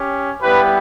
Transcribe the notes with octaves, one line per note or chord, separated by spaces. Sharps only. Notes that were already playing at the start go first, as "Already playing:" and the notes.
Already playing: C#4 G4
G3 B3 E4 G4 B4